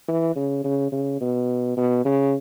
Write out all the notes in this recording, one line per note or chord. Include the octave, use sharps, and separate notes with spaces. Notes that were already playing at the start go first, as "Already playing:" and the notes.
E3
C#3
C#3
C#3
B2
B2
C#3